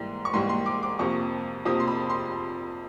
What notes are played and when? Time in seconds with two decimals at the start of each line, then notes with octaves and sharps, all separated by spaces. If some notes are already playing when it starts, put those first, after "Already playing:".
Already playing: G#2 E3 G3 A#3
0.25 C#6
0.34 G#2 E3 G3 A#3 C6
0.49 C6
0.66 D6
0.83 D6
0.99 F2 C3 F3 A#3 C#6
1.65 F2 C3 F3 A#3 D#6
1.80 C6
1.87 B5
2.10 C6